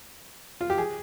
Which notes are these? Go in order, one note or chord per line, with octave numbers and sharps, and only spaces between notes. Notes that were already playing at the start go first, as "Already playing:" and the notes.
F4
G4
G#4